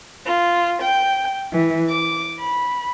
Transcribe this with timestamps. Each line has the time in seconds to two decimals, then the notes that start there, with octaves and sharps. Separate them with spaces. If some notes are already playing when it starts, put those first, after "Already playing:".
0.25 F4
0.81 G5
1.51 E3
1.89 D6
2.39 B5